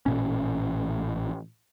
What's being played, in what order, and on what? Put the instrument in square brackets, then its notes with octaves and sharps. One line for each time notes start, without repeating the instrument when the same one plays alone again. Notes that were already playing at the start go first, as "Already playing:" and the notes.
[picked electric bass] A1 A#2 C#4